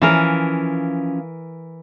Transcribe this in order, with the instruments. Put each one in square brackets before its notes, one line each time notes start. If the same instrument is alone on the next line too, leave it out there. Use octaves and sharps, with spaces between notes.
[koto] E3 A#4 [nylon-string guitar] F3 C#4 F5